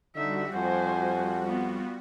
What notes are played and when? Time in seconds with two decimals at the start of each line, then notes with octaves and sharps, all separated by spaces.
0.16 D3 G3 D#4 F#4 E5
0.53 F2 C5 F#5 G#5
1.45 B3 F4